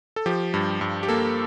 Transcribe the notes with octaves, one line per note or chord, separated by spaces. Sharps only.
A4
F3 G4
G2
G2
G4
A#3 A4